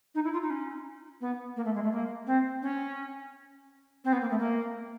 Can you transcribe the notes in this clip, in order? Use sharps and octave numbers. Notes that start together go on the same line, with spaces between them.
D#4
E4
F4
D#4
C#4
B3
A#3
A3
G#3
A3
A#3
C4
C#4
C4
B3
A#3
A3
A#3